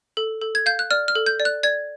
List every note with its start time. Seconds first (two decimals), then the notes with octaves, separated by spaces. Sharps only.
0.17 A4
0.42 A4
0.55 G#6
0.66 F5 G6
0.79 F#6
0.91 D5 F6
1.08 F6
1.15 A4
1.26 G6
1.40 D5
1.45 F#6
1.63 D5 G#6